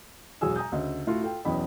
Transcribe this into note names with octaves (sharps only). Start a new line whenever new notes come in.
E1 B1 F#4 G#4 G#5 E6
G#5 A#5 D#6 G6
D2 C#3 D#5
A2 A3 F4 F#4
F4 A4 G5
B1 E2 C#4 D#5 G5 B5